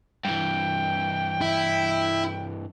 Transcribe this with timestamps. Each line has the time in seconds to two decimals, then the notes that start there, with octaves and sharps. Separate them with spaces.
0.25 G2 E3 G5
1.41 E4